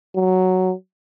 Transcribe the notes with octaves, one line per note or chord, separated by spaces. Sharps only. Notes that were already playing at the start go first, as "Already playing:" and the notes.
F#3